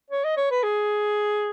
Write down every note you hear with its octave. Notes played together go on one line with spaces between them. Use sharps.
C#5
D#5
C#5
B4
G#4